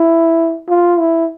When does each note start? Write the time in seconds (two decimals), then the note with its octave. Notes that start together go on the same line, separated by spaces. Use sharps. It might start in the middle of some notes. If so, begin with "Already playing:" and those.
Already playing: E4
0.69 F4
0.99 E4